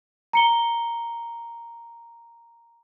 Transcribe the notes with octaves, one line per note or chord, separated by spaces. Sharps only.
A#5 C#7 G7